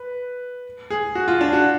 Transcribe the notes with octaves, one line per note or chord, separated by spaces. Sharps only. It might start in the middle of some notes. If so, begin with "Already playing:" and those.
Already playing: B4
G#4
F#4
F4
D4
F#4